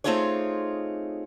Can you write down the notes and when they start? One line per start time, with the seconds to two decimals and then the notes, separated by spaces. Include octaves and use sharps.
0.04 A3 C4 D#4 F4 G#4 C#5